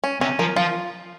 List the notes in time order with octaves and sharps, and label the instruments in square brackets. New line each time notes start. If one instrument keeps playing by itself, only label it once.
[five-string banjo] C#4
[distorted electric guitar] C3 [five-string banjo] C#4
[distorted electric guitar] F3 [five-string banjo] A#4
[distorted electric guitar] F3 [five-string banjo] F4